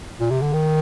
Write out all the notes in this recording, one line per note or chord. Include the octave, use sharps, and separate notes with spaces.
A#2
C3
D3
D#3